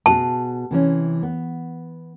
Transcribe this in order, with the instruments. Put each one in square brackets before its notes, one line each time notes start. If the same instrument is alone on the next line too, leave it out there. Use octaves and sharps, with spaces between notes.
[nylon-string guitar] B2 F#4 G#4 [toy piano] A5
[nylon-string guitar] C3 E3 C#4
B3